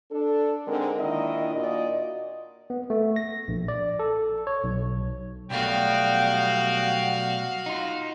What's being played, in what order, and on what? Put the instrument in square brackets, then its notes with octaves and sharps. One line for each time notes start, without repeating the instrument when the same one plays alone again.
[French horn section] D4 A4
D3 G#3 C4 D#4 A#4
A#2 D#3 D4 E4 D#5
A#2 F#4 D5 D#5
[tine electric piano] B3
A3
A#6
A#1
D5
A4
C#5
B1
[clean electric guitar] B1 A3 [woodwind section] G3 B3 [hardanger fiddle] F#4 F5 [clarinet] G5
[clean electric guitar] D#4 F4